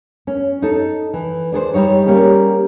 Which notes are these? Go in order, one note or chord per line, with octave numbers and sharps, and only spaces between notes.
C#4
D#4 A4
E3
D4 G#4 A4 C5
G3 D#4 C#5
G3 A#3 C#4 G4 G#4